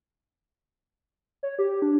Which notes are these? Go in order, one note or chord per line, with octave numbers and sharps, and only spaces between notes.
C#5
G4
D4